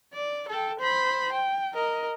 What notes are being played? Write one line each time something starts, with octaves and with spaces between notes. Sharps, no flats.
D5
A4 G5
C5 B5
G5
A#4 D#5